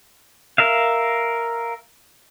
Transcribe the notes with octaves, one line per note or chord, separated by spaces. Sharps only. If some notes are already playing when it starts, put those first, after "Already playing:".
A#4 E5 F5